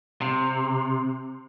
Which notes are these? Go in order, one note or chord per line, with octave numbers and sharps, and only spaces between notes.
C3